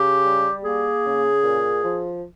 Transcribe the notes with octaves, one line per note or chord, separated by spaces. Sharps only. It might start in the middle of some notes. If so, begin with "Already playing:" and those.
Already playing: C#3 G4
G3
A#3 G#4
C#3
A#2
F3